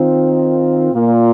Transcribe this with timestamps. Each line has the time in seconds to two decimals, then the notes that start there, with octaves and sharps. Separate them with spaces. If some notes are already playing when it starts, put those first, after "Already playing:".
Already playing: D#3 C4 F4
0.91 A#2 A#3 F4